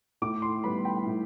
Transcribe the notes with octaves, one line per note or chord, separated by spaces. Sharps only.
A2 D6
C6
G3 B3 B5
G5
A2